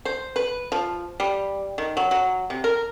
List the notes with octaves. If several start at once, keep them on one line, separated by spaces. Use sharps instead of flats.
C5
B4
F3
G3
D#3
F#3
F#3
C3
A#4